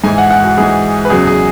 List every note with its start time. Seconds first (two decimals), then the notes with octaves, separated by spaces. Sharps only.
0.04 G#2 E3 G#5
0.18 F#5
0.30 F#5
0.44 F#4
0.57 G#2 E3 G#4
1.05 B4
1.10 E2 C#3 F#3 G#4
1.27 G#4